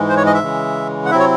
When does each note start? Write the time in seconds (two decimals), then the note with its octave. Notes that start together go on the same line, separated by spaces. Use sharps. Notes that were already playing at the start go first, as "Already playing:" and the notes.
Already playing: G#2 E3 G#3
0.09 C5
0.17 C#5
0.26 D#5
0.34 E5
0.43 C#3 E3 G#3
1.06 F#5
1.11 C3 F#3 C4 E4 E5
1.19 C#5